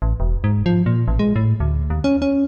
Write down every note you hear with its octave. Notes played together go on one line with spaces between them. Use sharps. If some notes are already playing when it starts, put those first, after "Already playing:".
A1
E1
G#2
F3
A#2
A1
G#3
A2
D2
D#2
C#4
C#4